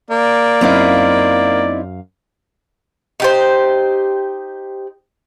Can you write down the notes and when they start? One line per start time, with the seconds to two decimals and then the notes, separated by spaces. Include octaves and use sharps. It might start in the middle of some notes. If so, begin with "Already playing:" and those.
0.10 A#3 D5
0.61 F#2 C4 D#4 E4 F5
3.20 D#4 G4 C5